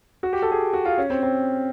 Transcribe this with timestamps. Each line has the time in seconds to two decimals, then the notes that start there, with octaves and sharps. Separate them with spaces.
0.23 F#4
0.33 G4
0.42 A4
0.52 G#4
0.73 F#4
0.85 F4
0.98 C#4
1.10 C4
1.23 C4